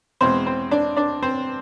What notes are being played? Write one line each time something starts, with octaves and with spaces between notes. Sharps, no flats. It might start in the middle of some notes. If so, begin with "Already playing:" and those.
E2 B2 G#3 C4 C5
C4 C5
D4 D5
D4 D5
C4 C5